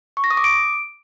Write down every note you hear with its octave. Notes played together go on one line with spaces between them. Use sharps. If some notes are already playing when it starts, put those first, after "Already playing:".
C#6
A#6
D#6
D6
D7